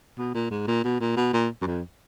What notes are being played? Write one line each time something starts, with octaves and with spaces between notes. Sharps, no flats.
B2
A#2
G#2
A#2
B2
A#2
B2
A#2
F#2
F2